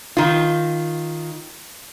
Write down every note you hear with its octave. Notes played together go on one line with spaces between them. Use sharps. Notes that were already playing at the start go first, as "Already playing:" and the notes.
D#3 F4